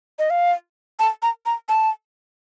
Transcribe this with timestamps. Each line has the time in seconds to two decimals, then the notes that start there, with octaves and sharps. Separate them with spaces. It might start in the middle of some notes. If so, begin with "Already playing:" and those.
0.19 D#5
0.30 F5
0.99 A5
1.23 A#5
1.46 A#5
1.69 A5